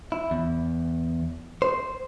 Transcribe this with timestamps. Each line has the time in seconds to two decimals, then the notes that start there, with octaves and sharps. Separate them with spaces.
0.12 E4
0.31 E2
1.62 C5